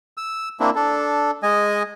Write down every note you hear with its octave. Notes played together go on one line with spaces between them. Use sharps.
E6
A#3 C4 D4 E4
D4 A4
G#3 D#5 G#5